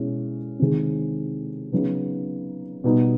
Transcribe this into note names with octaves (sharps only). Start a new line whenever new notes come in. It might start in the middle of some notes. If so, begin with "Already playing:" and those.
Already playing: B2 G#3 C#4 E4
C3 D#3 G#3 C4
C#3 F#3 B3 D#4
B2 G3 B3 D#4